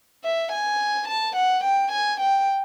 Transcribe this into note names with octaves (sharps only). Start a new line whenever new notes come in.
E5
G#5
A5
F#5
G5
G#5
G5